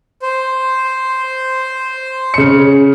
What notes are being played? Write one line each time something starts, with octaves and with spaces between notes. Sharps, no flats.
C5
C#3 C#7